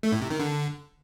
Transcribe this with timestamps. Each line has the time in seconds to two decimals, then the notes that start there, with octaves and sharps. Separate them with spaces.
0.03 A3
0.12 A2
0.21 C3
0.30 D#3
0.39 D3